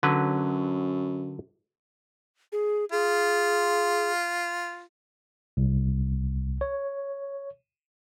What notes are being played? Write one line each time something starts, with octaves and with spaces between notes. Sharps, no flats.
F#2 D3 F#3 B4
G#4
F4 G#4
C2
C#5